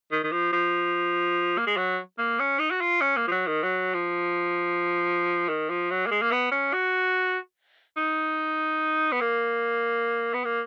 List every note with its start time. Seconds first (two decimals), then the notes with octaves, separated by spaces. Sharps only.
0.12 D#3
0.24 D#3
0.32 F3
0.53 F3
1.57 A#3
1.67 G#3
1.77 F#3
2.18 A#3
2.39 C#4
2.59 D#4
2.71 F#4
2.81 F4
3.01 C#4
3.17 A#3
3.27 F3
3.31 F#3
3.47 D#3
3.63 F#3
3.94 F3
5.49 D#3
5.70 F3
5.90 F#3
6.07 A#3
6.11 G#3
6.21 A#3
6.32 B3
6.52 C#4
6.73 F#4
7.97 D#4
9.12 B3
9.21 A#3
10.34 B3
10.45 A#3